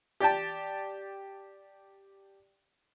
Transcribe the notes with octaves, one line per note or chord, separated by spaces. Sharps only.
G4 D5 G5 A5